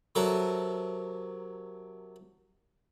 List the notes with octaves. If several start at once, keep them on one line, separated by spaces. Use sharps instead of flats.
C3 F#3 A4 A#4